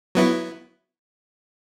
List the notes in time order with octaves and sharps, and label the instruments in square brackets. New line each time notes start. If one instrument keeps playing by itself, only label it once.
[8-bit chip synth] F#3 B3 E4